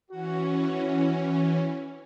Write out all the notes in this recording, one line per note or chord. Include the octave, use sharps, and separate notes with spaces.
E3 C#4 F#4